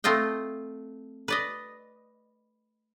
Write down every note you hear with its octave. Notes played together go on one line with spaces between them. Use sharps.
A3 C4 F4 D#5 G5
B4 D5 D#5